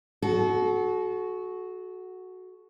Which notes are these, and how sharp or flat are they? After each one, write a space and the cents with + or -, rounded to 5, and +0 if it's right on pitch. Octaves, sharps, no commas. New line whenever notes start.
F#4 +0 A4 -40